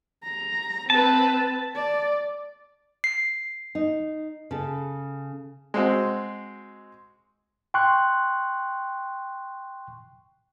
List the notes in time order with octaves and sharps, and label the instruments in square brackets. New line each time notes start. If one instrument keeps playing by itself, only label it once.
[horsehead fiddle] A#5
[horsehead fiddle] C4 B4 [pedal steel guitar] A5
[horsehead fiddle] D5
[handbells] C7
[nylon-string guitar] D#4
C#3 A4
[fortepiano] G#3 C4 F#4 C5
[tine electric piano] G5 C6 C#6 F#6